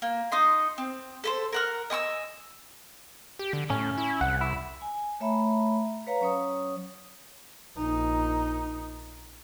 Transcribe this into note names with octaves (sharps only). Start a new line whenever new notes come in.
A#3
D#4 D#5 C6
C4
A4 B4 C5
A#4 F#5 F6
D#5 G#5 C#6 E6
G4
D3
A2 C#4
E4
C2 F#5
E4
G#5
A3 C#5 E5 A#5 B5
B4 C#5 F5 A#5
F#3 C#4 C#5 D#6
A#1 D#4